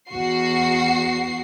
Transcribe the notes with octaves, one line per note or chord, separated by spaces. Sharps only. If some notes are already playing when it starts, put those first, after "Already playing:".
E2 F#4 C7